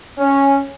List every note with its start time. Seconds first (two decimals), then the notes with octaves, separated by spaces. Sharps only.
0.18 C#4